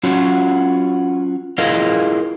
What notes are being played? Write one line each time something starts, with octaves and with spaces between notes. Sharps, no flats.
F#3 C#4 F4 F#4
E4 F4 G#4 A#4 D#5 F5